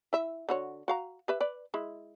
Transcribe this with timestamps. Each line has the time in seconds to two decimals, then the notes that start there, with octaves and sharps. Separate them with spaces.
0.13 E4 E5
0.49 D3 F#4 C#5
0.88 F#4 F5 A#5
1.28 G4 B4 E5
1.40 B4 D5
1.74 G#3 E4